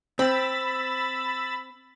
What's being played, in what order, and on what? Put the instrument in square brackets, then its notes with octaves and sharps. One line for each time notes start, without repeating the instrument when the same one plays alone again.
[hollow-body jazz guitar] C4 [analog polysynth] B5 E6 A6